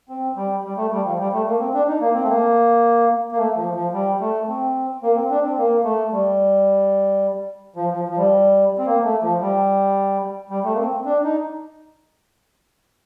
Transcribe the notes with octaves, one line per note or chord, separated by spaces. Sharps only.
C4
G3
G3
A3
G3
F3
G3
A3
A#3
C4
D4
D#4
A#3
C4
A3
A#3
A#3
A3
F3
F3
G3
A3
C4
A#3
C4
D4
C4
A#3
A3
G3
F3
F3
F3
G3
C4
A#3
A3
F3
G3
G3
A3
A#3
C4
C4
D4
D#4